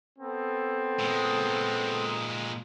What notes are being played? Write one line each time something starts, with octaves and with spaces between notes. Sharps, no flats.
B3 C4 A4
A#2 G#3